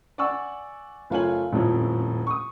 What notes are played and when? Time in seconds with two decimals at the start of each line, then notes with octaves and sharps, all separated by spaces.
0.18 D5 F#5 G#5 C#6 E6
1.10 F#1 A3 F4 C#5 G#5 F#7
1.53 D#1 F2 A2 F3 C#4
2.27 C#6 D#6